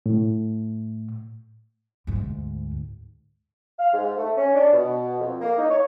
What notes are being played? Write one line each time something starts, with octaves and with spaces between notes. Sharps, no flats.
A2
D2 G#2
F5
G#2
A3
C#4
D4
B2
F2
A#3
D#4
C#5